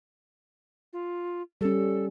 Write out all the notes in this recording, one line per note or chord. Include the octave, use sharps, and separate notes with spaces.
F4
G3 C#4 A4